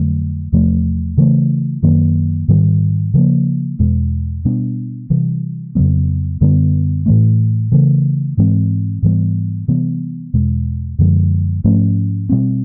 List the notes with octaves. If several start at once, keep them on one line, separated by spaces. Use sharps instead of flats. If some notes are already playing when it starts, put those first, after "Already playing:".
Already playing: F2 D3 F#3 A3
E2 C3 F3 A3
C#3 E3 A3
F#2 D#3 F#3 A#3
G#2 D#3 G3
C#3 F3 A#3
E2 B2 G#3
B2 G3 B3 D4
C3 E3 G3
F2 C#3 F#3 B3
F#2 D3 G3 B3
A2 E3 A3
C#3 E3 A3
G#2 E3 G#3 C4
G#2 E3 G3 B3
C3 E3 G3 B3
E2 B2 G#3
F#2 D3 F3 G#3
G#2 F3 A3 C#4
B2 G3 C4